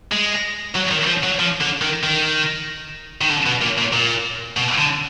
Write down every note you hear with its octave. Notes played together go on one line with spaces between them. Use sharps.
G#3
F#3
D#3
F3
F#3
F3
D3
D#3
D#3
D#3
D3
B2
A#2
A#2
A#2
B2
D3